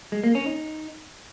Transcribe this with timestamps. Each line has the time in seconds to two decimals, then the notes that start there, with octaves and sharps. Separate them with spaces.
0.12 G#3
0.24 A#3
0.35 C#4
0.46 D#4